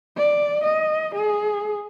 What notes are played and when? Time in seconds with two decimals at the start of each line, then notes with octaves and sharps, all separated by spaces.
0.17 D5
0.64 D#5
1.15 G#4